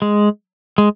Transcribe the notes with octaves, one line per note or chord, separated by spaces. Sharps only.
G#3
G#3